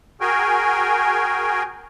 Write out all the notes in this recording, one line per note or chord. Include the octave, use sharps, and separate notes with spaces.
F#4 G#4 A#4 G5 G#5